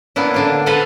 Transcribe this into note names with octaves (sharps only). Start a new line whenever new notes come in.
A#3 B3 D4 E4
D3 D4 F4
A4 B4 C5 F5 F#5 G#5